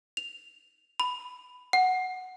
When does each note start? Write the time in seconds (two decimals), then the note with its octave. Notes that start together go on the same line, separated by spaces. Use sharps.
0.17 F7
1.00 B5
1.73 F#5